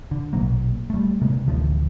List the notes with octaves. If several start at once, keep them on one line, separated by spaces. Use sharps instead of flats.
D3
A#1 B2 F#3 A#3
G3 A3
C3 G#3 A#3
A1 D2 D3 F3